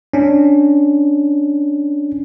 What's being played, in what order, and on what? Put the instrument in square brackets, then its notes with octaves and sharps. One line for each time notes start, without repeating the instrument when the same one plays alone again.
[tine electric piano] C#4 D4